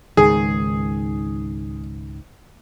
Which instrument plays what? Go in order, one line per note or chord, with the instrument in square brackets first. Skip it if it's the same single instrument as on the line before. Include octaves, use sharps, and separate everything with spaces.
[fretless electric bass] C#2 G#2 D#3 [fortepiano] G#4